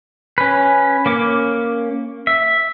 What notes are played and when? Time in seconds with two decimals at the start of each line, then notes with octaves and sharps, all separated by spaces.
0.38 C#4 B4
1.06 A#3 C#4 D6
2.27 E5